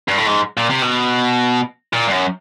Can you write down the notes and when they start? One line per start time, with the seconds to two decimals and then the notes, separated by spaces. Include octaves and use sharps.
0.08 G2
0.17 A2
0.26 G#2
0.57 A#2
0.70 C3
0.82 B2
1.93 A#2
2.08 G2
2.12 F#2